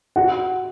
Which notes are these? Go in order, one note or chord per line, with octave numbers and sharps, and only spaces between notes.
F#4 F#5